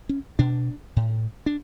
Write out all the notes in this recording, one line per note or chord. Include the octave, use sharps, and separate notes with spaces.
C#4
B2 D4
A2
D4